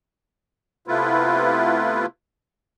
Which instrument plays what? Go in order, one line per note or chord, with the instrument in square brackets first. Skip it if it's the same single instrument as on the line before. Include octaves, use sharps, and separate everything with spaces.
[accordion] C3 A3 B3 E4 F4 B4